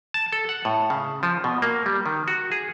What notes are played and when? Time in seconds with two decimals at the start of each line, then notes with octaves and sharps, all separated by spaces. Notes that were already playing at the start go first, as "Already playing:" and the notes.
0.14 A5
0.32 A4
0.49 F#5
0.65 A2
0.90 C#3
1.23 F3
1.44 B2
1.62 A#3
1.86 G3
2.06 D#3
2.28 F#4
2.52 G#4